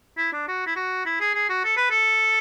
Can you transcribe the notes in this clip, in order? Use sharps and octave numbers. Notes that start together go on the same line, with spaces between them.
E4
D4
F#4
E4
F#4
E4
G#4
G#4
F#4
A4
B4
A4